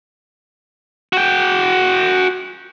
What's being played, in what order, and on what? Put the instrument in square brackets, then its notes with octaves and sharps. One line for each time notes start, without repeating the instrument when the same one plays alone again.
[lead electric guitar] F#4 G5